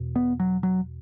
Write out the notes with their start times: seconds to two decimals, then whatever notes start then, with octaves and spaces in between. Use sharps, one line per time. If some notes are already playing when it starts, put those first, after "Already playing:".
Already playing: E2 B2
0.16 B3
0.40 F#3
0.63 F#3